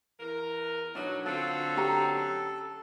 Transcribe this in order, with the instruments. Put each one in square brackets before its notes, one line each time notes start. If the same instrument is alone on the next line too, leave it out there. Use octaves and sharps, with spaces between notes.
[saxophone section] E2 A#4
[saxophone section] B2 F#3 [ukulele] D4 D#4
[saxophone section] D3 F#3 C4 [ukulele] F4 [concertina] A4
[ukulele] C#4 G4 A#5